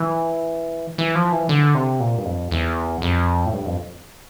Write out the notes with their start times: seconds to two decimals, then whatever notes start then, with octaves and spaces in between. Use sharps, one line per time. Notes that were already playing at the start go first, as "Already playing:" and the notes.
Already playing: E3
0.98 E3
1.15 F3
1.32 E3
1.49 D3
1.75 C3
2.00 A#2
2.18 G2
2.25 F2
2.51 E2
3.02 F2
3.46 A2
3.53 G2
3.66 F2